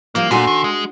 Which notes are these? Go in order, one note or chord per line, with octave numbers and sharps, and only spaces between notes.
D#3 F3 G3 A#3
A#2 D4 F4 F#4 A4 G#5 C6
D#3
G#3